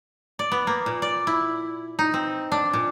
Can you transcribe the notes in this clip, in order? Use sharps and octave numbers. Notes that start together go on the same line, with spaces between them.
D5
B3
A#3
A#2
D5
E4
D#4
C4
D4
A#2